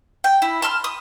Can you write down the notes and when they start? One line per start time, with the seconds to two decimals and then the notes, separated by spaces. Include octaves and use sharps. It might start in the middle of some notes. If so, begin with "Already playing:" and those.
0.24 G5
0.42 E4
0.62 A5 C6 F6
0.84 D#6